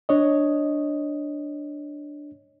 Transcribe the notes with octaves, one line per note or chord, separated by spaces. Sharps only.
D4 C#5 D#5